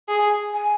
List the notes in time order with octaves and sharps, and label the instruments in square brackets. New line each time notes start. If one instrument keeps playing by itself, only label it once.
[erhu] G#4
[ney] G#5